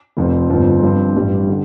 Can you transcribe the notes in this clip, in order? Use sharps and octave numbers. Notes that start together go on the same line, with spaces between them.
F1 F2 F3 C4
G1 F2 F3 C4
G2 F3 C4
A1 G2 G3
D3